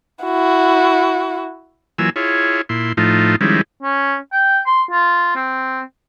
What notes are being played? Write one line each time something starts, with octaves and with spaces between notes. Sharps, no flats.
E4 F#4
E3 F#3 A#3 F4 G#5 E6
E4 F4 G#4 C#5
A#2 E4 C6
A2 F3 A3 D#4 F4
D#3 F3 G3 G#3 C#4 E4
C#4
G5
C6
F4
C4